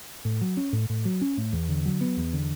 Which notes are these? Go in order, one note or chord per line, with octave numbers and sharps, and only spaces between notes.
A2
F#3
C#4
A2
A2
F#3
C#4
A2
E2
D3
F#3
B3
E2
D3